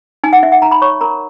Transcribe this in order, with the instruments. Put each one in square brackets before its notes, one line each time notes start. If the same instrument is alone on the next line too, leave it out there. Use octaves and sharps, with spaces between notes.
[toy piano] D#4 G#5
F#5
D#4 E5
F#5
D#4 A#5
B5
C#5 C#6
A#4 A#5